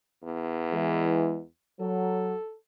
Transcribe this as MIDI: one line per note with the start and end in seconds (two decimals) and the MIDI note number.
0.24 1.47 40
0.73 1.40 52
0.73 1.40 56
1.80 2.33 54
1.80 2.55 69